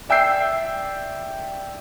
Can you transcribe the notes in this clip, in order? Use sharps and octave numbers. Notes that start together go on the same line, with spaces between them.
D5 E5 G5 E6 G6 C7